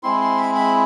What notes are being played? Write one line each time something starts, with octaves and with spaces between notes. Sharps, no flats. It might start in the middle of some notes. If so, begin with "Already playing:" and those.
G#3 C4 E4 C6
C6
B5
B5